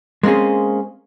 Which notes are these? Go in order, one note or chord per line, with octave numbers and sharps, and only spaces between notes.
G#3 A#3 C4 C#4 G#4